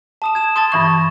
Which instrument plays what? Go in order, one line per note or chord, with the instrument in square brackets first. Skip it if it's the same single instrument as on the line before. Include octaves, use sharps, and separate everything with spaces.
[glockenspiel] A5 D#6 E7
G#6 E7
[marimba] A5 D#6 [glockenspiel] C6 G#6 A6
[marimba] G2 E3 C#6